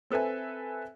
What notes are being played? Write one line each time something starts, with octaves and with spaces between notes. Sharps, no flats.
C4 A4 B4 E5 G#5